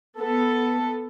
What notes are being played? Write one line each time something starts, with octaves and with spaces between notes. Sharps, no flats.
B3 A4